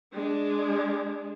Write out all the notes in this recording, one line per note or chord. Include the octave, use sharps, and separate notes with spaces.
G#3 D4